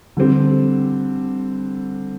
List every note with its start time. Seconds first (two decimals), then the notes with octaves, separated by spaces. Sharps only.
0.17 D3 G3 C4 G4